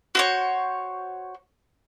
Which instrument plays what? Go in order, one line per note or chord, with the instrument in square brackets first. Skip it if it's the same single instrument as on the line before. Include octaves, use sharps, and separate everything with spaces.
[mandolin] F#4 C5 C#5